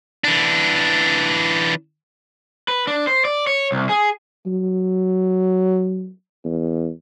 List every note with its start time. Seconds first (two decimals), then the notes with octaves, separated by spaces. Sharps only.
0.24 E3 D4
2.68 B4
2.87 D4
3.07 C5
3.25 D5
3.47 C#5
3.72 C2
3.89 G#4
4.46 F#3
6.45 E2